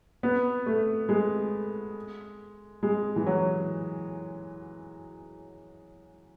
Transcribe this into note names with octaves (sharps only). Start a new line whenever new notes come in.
B3
A3
G#3
G#3
E3
F#3